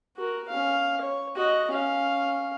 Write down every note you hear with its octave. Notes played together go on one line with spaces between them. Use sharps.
F#4 A#4
C#4 F5
C#5
F#4 D#5
C#4 F5